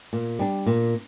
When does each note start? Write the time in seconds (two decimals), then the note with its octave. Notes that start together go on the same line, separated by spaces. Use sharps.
0.13 A#2
0.39 G3 D4
0.66 A#2